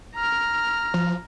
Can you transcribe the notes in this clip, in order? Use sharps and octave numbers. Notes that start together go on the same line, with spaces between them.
A#5 F6
F3